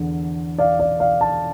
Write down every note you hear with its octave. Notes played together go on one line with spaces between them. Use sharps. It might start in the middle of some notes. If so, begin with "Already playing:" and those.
Already playing: E2 D3
D5 F5
D5 F5
D5 F5
F5 A5